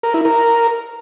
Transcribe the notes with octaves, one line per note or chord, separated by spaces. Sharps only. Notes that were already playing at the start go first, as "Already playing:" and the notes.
A#4
E4
A#4